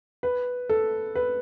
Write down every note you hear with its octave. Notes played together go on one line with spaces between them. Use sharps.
B4
A4
B4